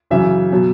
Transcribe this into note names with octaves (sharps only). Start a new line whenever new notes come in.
F#2 C#3 E3 E5
B2 F#3